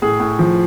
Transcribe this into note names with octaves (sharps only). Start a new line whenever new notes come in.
A2 G#4
A2
F3